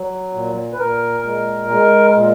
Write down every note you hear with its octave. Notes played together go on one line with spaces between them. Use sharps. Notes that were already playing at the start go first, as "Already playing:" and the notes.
Already playing: F#3
A#2
B4
A#2 A#4
G#3
G#3
A#2